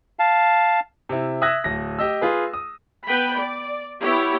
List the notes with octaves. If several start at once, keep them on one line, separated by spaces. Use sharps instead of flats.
F5 A5
C3 E4
E5 D#6 E6 F#6 G#6 A#6
D1 A#6
G4 D#5 E6
F4 G#4 B4
D#6
B3 B4 G5 B5
D5
B3 E4 G4 C#5